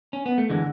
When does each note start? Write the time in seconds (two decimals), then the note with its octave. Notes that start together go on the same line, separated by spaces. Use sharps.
0.13 C#4
0.26 B3
0.38 A3
0.50 D3 E3 G#3